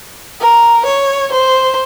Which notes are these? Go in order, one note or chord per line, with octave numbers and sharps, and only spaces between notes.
A#4
C#5
C5